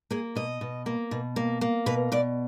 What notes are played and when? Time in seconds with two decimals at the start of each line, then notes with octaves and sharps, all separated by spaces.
0.11 A#3 G#4
0.35 B2 D#5
0.61 B2
0.86 A#3
1.11 B2
1.36 A#3
1.61 A#3
1.86 B2 B4
2.12 B2 D5